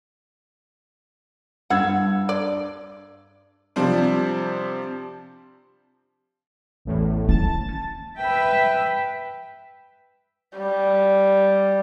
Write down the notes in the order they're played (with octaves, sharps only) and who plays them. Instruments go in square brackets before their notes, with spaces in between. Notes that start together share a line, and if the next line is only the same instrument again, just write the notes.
[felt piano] G2 E6 G#6 [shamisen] F#5
[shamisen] D5
[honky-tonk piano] C3 F3 G3 C4 D4
[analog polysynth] A1 E2 A2
[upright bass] C#4 [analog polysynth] A5 A6
[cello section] B4 E5 [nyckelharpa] G5
[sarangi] G3